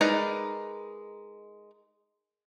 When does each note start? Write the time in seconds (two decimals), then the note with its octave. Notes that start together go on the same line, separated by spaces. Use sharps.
0.01 G#3 D#4 A#4 B4 D5